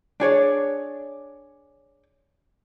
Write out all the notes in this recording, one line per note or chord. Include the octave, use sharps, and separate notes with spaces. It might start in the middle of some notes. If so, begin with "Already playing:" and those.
D4 G#4 C#5 D5